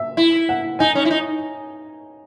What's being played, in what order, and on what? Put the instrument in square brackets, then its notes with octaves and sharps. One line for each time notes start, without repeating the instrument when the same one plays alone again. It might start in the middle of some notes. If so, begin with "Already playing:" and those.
Already playing: [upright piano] E5
[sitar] E4
[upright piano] F#5
[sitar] D#4 [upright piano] G#5
[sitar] C#4
E4
D#4